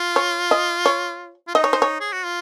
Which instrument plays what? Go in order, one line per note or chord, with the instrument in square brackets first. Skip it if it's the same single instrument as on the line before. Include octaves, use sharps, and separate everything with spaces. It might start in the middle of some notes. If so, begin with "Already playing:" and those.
Already playing: [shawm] F4
[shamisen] C#5
D#5
C#5
[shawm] F4
[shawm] D#4 [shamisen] D#5
[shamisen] C#5
C5
C#5
[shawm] G#4
F#4
F4